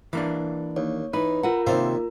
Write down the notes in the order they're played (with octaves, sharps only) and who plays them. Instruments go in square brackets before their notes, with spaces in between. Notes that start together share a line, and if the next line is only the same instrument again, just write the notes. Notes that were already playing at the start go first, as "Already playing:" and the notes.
[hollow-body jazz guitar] E3 A#3 D4 [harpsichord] D6
[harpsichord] D#2 [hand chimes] C#5
[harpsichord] E3 [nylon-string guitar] D#4 [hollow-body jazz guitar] B4
[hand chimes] F4 A#4 A#5 [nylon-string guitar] F#5
[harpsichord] D#2 D5 E5 [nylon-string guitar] C3 C5 F5